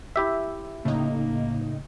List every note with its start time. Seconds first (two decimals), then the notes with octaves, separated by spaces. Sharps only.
0.16 E4 G4 E5
0.85 A2 C#3 A#3 D#4